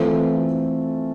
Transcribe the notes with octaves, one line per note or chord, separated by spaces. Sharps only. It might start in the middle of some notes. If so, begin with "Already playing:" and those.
Already playing: E3 A3 C4 F4 A4